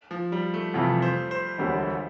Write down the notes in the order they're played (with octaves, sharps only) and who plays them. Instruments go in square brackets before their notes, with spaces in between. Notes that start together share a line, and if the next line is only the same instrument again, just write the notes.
[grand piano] F3
G3
A3
[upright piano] F2 C3 E3 [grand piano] F4
[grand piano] C5
C5
[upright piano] E1 D2 D3 G3